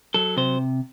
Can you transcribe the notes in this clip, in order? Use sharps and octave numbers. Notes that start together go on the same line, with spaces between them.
F#3 A4
C3 C5